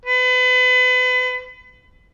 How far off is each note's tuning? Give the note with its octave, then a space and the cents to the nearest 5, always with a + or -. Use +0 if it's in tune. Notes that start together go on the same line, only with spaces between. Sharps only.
B4 +35